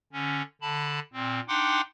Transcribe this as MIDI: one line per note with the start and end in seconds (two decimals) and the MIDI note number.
0.13 0.42 50
0.13 0.42 61
0.62 1.00 50
0.62 1.00 81
0.62 1.00 83
1.13 1.40 46
1.13 1.40 60
1.48 1.81 62
1.48 1.81 63
1.48 1.81 78
1.48 1.81 79
1.48 1.81 84
1.48 1.81 86